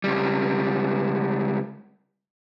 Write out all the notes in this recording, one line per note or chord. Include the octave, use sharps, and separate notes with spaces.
C#2 G3